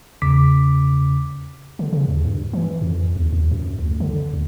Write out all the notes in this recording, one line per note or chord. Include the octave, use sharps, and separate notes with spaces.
E2 C#3 D6 B6
D3
C#3
D#2
G2
E3
F2
D#2
D#2
F#2
D2
D3
D2